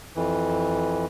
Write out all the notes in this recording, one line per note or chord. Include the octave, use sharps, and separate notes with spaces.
F2 E3